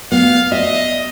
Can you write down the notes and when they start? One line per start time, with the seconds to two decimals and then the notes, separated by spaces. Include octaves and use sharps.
0.12 B3 F5
0.52 D#5 E5